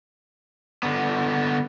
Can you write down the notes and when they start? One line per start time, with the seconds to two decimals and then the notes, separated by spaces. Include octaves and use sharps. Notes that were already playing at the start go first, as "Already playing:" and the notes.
0.83 D3 B3